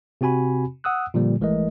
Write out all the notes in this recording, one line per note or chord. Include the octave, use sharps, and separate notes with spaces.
C3 C4 F#4 G#5 B5
F#5 D#6 E6 F#6
A#2 D3 F3 G3 A#3
G#1 E3 G#3 A3 A#4 D#5